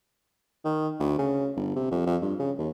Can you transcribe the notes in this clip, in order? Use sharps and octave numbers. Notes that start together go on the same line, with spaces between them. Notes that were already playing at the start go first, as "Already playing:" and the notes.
D#3
D2
C#3
G1
C3
F2
F2
G2
C#3
D#2